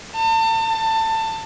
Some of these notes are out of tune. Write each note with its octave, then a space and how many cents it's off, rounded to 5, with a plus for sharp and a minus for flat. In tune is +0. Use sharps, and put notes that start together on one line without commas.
A5 +35
A5 +20